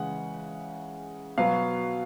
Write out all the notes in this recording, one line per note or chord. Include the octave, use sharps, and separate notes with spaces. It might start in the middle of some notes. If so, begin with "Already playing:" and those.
Already playing: C#3 E3 G#3 F#5
B2 F#3 B3 F5